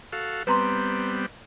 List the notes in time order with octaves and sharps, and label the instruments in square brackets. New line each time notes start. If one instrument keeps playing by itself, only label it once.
[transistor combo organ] F#4 A4 F5
[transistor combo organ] G3 B3 C4 [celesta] B4 A#5 C6